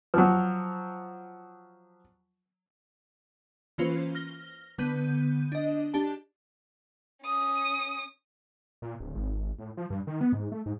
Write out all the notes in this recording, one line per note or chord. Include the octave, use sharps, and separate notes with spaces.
F3 F#3
E3 A#3 C#4 F4 B4 C5
F6 A#6 G7
D3 B3 B4 G6 D#7
D4 D#5
D4 G4 A5
C#4 D#6
A#2
D1
G#1
A2
F3
G2
D#3
B3
G#2
A3
G#2